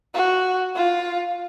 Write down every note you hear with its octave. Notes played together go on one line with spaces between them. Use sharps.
F#4
F4